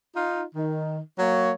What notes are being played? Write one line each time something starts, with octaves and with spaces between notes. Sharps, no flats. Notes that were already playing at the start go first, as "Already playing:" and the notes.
D#4 F4
D#3
F#3 A#3 C#5